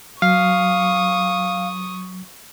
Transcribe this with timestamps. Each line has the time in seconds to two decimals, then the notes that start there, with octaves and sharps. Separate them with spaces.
0.22 F#3 F5 C#6 D#6